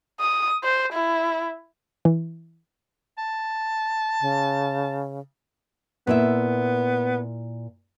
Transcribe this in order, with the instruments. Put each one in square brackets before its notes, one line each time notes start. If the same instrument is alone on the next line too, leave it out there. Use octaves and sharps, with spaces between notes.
[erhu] D#6
C5
E4
[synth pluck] E3
[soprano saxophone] A5
[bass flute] C#3
[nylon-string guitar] A#2 E4 E5 [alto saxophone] B3